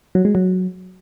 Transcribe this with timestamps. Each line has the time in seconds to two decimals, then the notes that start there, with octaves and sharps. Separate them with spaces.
0.15 F#3
0.25 G#3
0.35 F#3